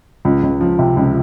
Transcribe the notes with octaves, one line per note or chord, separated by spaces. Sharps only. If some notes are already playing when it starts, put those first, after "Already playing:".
C#2
C#2
F3
C3
C#2